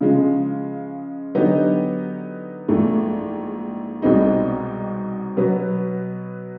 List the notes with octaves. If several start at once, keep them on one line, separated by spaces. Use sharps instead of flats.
C#3 F3 G#3
D3 F#3 B3 D#4 G4
A#1 G#2 E3 A3
C2 B2 G#3 C4 D#4
B2 F#3 B3